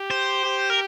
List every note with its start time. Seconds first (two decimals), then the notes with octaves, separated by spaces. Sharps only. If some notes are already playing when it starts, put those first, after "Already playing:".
Already playing: G4
0.11 C5
0.45 G4
0.70 A#4